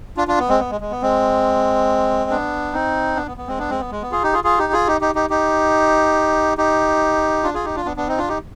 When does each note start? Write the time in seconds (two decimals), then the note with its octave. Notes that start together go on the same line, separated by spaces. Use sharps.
0.17 D4 F4
0.28 D4 F4
0.38 B3
0.49 G#3 C4
0.59 B3
0.71 G#3
0.81 G#3
0.91 B3
1.02 G#3 C4
2.30 B3 D4
2.73 C4 D#4
3.16 B3 D4
3.27 B3
3.37 B3
3.47 G#3 C4
3.58 B3 D4
3.69 G#3 C4
3.80 B3
3.91 G#3
4.02 B3
4.12 F4 G#4
4.23 D#4 G4
4.33 F4 G#4
4.44 F4 G#4
4.58 D#4 G4
4.73 F4 G#4
4.87 D#4 G4
5.01 D#4 G4
5.15 D#4 G4
5.30 D#4 G4
6.58 D#4 G4
7.43 D4 F4
7.54 F4 G#4
7.64 D#4 G4
7.75 D4 F4
7.86 B3 D4
7.97 B3 D4
8.08 C4 D#4
8.18 D4 F4
8.28 D#4 G4